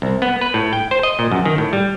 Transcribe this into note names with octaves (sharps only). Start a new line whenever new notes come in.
C2
B3
B4
A2
G5
C5
D#5
A#2
F#2
D#3
A2
G3